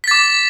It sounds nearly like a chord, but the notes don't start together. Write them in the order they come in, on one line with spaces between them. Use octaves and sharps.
B6 A6 D6